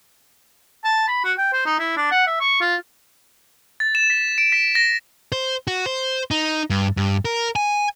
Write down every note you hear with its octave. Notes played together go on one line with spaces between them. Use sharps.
A5
B5
F#4
G5
C5
D#4
E4
D4
F#5
E5
C#6
F4
A6
E7
B6
D7
B6
A#6
C5
F#4
C5
D#4
G2
G2
A#4
G#5